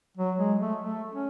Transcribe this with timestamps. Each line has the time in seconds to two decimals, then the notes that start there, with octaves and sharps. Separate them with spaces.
0.17 F#3
0.38 G#3
0.60 A3
0.80 A3
1.12 C#4